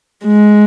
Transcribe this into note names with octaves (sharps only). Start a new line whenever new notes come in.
G#3